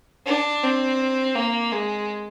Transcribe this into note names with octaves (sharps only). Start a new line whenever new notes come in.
D4
C4
A#3
G#3